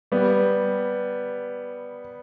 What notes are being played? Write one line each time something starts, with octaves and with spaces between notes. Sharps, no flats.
G3 B3